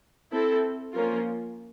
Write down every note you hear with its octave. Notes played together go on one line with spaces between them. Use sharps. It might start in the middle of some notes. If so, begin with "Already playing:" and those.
C4 E4 A4
F3 A#3 C#4 F4 A#4